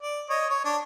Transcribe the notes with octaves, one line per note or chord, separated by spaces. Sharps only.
D5
C#5 D#5
C#5
D4